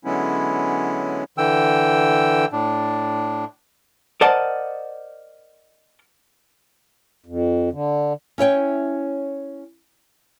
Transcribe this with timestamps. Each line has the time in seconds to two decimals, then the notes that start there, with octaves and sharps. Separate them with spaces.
0.05 D3 F#3 G#3 B3 C#4 E4
1.38 D3 E3 G5 E6
2.52 A2 D4
4.21 A#4 C5 D5 D#5 F#5 A5
7.26 F2
7.72 D3
8.38 C#4 E4 C#5 G5